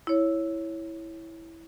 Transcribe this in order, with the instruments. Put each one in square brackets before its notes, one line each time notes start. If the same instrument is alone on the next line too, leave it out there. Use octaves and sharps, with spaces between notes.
[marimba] E4 C#5